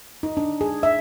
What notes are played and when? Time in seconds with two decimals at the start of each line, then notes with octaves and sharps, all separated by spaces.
0.23 D#4
0.37 D4
0.61 G#4
0.83 E5